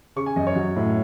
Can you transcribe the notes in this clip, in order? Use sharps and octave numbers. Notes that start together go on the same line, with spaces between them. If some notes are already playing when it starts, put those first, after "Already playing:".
C#3 C#6
G#5
F#2 D#5
C#5
F#3
A2